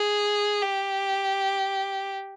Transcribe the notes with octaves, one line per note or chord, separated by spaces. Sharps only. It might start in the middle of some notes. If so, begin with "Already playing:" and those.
Already playing: G#4
G4